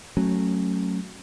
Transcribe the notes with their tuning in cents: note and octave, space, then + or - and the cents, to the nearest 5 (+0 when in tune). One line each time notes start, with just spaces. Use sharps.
F#3 +0 A3 +0 C#4 -15